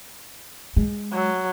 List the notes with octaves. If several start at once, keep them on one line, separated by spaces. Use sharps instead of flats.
G#3
F#3